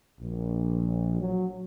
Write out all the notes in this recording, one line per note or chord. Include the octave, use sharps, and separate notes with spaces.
A#1
F#3